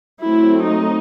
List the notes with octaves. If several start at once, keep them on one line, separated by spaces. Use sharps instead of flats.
F#3 A3 C4 E4
D#4